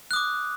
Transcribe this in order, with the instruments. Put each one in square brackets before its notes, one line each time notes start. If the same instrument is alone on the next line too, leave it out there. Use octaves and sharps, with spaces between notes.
[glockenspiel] F#6
D#6
D6